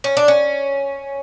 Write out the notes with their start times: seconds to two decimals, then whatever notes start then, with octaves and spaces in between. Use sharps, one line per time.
0.04 C#4
0.17 D4
0.28 C#4